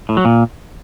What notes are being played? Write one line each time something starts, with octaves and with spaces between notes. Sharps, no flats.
A2
F#3
A#2